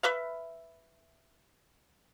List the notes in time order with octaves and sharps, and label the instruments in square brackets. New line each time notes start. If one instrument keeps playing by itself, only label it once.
[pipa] B4 E5 F5